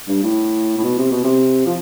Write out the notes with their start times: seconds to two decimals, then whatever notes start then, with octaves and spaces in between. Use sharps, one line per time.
0.08 G2
0.23 A2
0.78 A2
0.84 B2
0.99 C3
1.11 B2
1.24 C3
1.66 F3